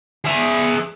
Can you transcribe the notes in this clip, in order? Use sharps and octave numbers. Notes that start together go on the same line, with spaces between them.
G#4 E5